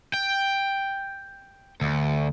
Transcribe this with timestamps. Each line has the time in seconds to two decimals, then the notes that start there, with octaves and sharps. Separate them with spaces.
0.14 G5
1.81 D2